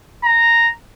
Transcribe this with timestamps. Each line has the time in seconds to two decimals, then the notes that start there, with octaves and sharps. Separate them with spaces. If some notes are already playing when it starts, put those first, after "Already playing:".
0.24 A#5